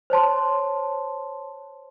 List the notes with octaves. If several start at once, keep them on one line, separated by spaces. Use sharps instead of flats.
C5 C#5 A5 C6